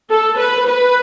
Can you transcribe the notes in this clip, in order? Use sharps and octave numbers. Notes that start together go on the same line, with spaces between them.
A4
B4
B4